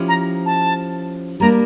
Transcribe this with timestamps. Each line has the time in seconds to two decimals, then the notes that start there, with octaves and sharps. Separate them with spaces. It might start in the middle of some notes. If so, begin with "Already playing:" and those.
Already playing: F3 C#4 E4 G4
0.08 A#5
0.46 A5
1.40 G3 A#3 D4 A#5